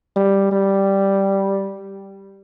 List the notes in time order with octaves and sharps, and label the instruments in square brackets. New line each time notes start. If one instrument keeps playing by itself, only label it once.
[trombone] G3
G3